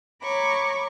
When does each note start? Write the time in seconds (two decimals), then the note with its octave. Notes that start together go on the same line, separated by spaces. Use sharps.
0.22 C#5 A#5 B5 C#6 D6